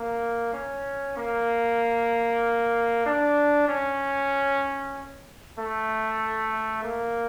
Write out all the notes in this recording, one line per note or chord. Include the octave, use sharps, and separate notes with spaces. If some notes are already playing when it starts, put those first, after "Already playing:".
Already playing: A#3
C#4
A#3
D4
C#4
A3
A#3